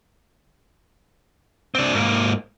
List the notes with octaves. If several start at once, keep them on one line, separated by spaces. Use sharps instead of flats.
C4 D4
G#2 A#3